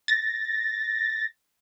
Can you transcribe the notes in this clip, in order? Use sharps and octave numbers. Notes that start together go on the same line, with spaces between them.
A6 A#6